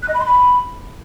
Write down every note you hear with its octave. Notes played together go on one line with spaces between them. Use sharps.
F#6
D#5
B5
C6
B5